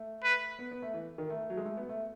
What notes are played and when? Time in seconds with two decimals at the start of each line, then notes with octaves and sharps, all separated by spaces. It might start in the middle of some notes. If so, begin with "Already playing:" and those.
Already playing: A3
0.24 B4
0.59 B3
0.71 B3
0.82 A3
0.94 E3
1.18 D#3
1.30 A3
1.50 F#3
1.57 G#3
1.65 A3
1.77 B3
1.89 A3